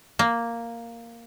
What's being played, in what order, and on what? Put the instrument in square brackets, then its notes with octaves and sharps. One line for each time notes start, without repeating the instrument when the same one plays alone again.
[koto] A#3